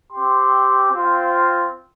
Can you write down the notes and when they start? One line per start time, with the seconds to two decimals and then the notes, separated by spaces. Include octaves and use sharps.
0.13 C4 G4 C6
0.91 C4 F4